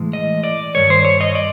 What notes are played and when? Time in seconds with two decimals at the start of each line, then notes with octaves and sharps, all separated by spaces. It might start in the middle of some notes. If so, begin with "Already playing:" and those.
Already playing: A2 E3 G#3
0.13 D#5
0.44 D5
0.75 G2 D#3 C#5
0.90 C5
1.05 C#5
1.21 D#5
1.35 D5